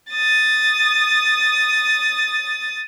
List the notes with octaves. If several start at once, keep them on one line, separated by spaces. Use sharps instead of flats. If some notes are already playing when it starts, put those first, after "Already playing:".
D#6 A6